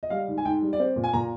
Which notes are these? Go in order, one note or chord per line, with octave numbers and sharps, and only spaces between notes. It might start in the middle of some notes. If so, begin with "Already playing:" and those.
D#5
G3 F5
G#2
G#5
G#2 G5
G3
D5
C4 C5
A#2
G#5
A#2 A#5